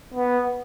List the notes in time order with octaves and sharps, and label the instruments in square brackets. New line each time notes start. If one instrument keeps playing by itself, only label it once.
[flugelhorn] B3